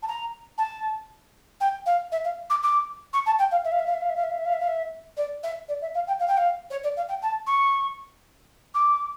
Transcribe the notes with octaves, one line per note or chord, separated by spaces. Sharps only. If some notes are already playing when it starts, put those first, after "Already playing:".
A5
A#5
A5
G5
F5
E5
F5
D6
D6
C#6
A5
G5
F5
E5
F5
E5
F5
E5
F5
E5
F5
E5
F5
E5
F5
E5
F5
E5
D5
E5
D5
E5
F5
G5
F5
G5
F5
C#5
D5
F5
G5
A5
C#6
D6